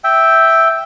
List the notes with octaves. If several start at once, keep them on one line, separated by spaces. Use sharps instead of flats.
E5 G5